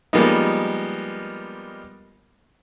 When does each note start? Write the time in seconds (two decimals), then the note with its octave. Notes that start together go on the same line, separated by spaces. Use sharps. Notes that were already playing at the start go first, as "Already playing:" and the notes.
0.13 F3 G3 G#3 A#3 B3 D#4